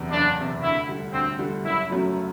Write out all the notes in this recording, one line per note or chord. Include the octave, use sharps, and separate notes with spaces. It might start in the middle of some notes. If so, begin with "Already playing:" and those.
Already playing: F#1 E2 C3
F#1 D4
E2 C3
D2 E4
D3 G3
D2 C4
D3 G3
F#1 E4
F#2 F#3 A3